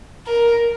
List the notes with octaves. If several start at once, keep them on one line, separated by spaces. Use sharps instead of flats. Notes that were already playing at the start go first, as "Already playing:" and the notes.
A#4